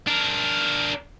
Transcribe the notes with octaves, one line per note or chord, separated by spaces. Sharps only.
D4 A#4